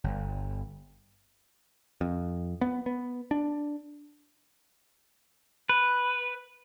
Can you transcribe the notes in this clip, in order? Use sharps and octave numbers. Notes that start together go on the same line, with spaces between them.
G1
F2
B3
B3
D4
B4